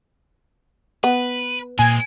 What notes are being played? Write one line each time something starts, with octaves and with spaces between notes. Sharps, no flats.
B3 B4
A#2 G#3 C4 G#5 G#6